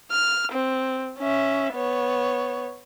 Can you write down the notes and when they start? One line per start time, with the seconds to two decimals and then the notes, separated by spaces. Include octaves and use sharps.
0.12 F6
0.52 C4
1.19 C#4 E5
1.74 B3 C#5